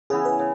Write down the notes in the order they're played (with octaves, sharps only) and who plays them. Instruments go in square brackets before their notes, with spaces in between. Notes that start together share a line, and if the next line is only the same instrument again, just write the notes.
[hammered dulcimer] C#3 E3 B3 E4 [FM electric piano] G#4
[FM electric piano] B4
[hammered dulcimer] C#3